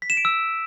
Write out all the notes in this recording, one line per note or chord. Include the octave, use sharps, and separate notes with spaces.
B6
E7
D7
E6